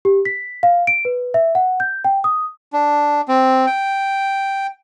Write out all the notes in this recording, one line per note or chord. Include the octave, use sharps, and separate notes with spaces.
G4
B6
F5
D7
B4
E5
F#5
G6
G5
D#6
D4
C4
G5